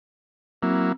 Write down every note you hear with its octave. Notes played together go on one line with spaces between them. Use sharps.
F#3 A#3 C4 E4